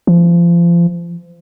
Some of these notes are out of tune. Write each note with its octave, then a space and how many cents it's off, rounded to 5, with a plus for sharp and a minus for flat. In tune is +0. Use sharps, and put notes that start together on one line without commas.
F3 -30